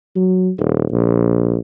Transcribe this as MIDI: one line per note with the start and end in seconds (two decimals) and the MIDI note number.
0.16 0.51 54
0.59 0.85 27
0.92 1.57 34